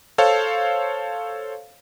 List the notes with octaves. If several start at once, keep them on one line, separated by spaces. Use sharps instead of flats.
A4 C5 C#5 F5